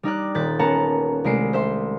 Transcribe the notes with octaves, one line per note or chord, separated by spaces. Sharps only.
G3 D#4 D5 F#6
D#1 F#6 G6 A6 B6
B3 C#4 A#4 F#5 A5 A#5
C2 G#3 A3 E4 C7 D7
C5 E5 C6